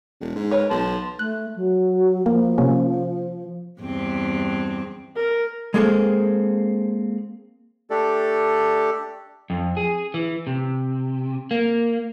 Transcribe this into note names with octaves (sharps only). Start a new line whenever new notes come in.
E1
G#2
A#4 B4 C#5
B1 A5 C6
A3 F#6
F#3
F3 A#3
C3 A#3 C#4
E2 G2 C4
A#4
G#3 A#3 C4 G#4 A4
A3 D4 G4 A4 D5
F2
G#4
E3
C3
A#3